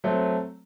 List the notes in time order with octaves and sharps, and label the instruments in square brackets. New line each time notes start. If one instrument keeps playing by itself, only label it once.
[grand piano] F#3 A3 C4